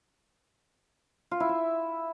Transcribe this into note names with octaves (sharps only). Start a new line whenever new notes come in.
F4
E4
E5